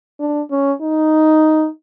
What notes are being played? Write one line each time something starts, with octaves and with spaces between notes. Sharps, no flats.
D4
C#4
D#4